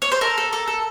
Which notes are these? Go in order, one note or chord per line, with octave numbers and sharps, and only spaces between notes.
C#5
C5
A4 A#4
A4
A4
A4